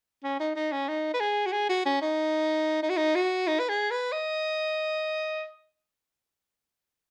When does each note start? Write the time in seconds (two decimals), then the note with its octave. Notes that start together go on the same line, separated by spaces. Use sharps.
0.23 C#4
0.40 D#4
0.55 D#4
0.72 C#4
0.88 D#4
1.14 B4
1.20 G#4
1.46 F#4
1.52 G#4
1.69 F#4
1.85 C#4
2.01 D#4
2.83 D#4
2.89 F#4
2.97 D#4
3.15 F#4
3.47 D#4
3.59 B4
3.69 G#4
3.91 B4
4.12 D#5